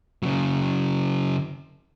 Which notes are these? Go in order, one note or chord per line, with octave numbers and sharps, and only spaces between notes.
C#3 F#3